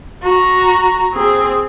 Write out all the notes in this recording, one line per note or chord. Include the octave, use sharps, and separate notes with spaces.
F#4 A#5
C4 G#4